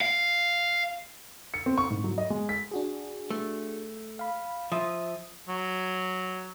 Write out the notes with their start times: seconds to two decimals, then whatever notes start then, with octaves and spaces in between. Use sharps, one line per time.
0.01 F5
1.54 C#7
1.66 C4
1.78 C#6
1.90 G#2
2.04 F#3
2.18 D#5
2.30 G#3
2.49 B6
2.71 D4 F#4 G#4
3.30 A3
4.19 F5 B5
4.72 F3 E5 D#6
5.48 F#3